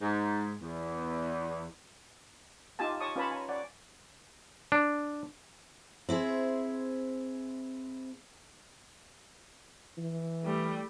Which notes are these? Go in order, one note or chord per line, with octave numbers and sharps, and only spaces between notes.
G#2
E2
D#4 F4 G4 G#5 A5
C#5 A5 C#6 D#6
C#4 F4 B4 C#5 A5 B5
G#5 A#5
C#5 D5 F#5
D4
C4 E4 G#4 C5
E3
G3 A3